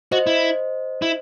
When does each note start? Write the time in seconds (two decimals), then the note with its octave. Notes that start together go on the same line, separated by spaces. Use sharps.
0.12 F#4 C5 D#5
0.27 E4
1.02 E4